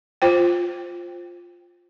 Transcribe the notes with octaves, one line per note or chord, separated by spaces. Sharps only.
F4 C5 G5